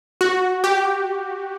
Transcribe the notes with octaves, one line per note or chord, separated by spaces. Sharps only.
F#4
G4